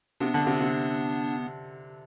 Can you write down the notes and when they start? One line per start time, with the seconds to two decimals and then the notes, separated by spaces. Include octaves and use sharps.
0.20 C3 B3 D4
0.34 D3
0.47 C3
0.61 C3